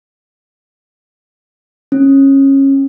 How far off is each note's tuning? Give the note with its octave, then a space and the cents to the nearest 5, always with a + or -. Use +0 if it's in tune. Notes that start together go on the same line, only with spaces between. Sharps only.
C#4 -20